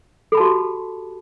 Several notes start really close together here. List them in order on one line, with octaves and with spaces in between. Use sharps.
A4 B5 A5 F#4 G4